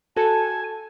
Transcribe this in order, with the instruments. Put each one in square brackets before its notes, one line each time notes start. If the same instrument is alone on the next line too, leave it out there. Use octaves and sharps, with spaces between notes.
[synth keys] F#4 A4 [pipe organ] G#5 [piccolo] A5